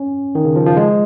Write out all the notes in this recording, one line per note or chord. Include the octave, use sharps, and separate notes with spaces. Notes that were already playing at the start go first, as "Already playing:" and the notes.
Already playing: C#4
D#3
C#3
F3
F3
G#3